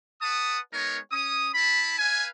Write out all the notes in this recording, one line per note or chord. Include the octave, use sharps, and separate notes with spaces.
B4 F#5 A5 D#6
G#3 B3 D#4 A#4 C#5
C#4 D#6
E4 A5 B5
B4 F5 G#5